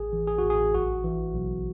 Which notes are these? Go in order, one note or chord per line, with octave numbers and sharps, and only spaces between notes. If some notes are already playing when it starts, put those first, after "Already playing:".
Already playing: A1 G#4
E3
G#4
A1 F#4
G#4
B1 F#4
E3
B1